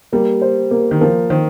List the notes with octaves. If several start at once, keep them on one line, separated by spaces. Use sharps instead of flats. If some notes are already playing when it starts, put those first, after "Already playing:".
G3 A#3
C5
A#3
D#3
F3 A#3
D#3 C5